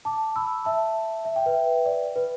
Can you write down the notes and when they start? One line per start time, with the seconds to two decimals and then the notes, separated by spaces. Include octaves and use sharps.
0.05 A5 D6
0.36 B5 E6
0.65 E5 A5
1.25 E5
1.36 G5
1.46 B4 E5
1.86 D5
2.16 B4